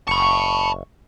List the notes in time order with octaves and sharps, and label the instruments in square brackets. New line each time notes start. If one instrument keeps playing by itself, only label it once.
[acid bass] F#1 [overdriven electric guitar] A5 B5 [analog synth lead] C#6